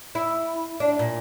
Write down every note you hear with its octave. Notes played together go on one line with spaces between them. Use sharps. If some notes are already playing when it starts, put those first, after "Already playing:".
E4
D4
A#2